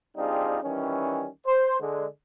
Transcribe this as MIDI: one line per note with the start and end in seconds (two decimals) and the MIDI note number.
0.16 0.58 55
0.16 0.58 60
0.16 0.58 62
0.16 0.58 63
0.16 0.58 65
0.16 0.58 68
0.64 1.27 51
0.64 1.27 52
0.64 1.27 55
0.64 1.27 61
1.47 1.78 72
1.81 2.06 50
1.81 2.06 56